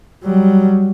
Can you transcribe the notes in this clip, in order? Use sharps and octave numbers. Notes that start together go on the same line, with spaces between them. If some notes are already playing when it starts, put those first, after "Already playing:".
F#3 G3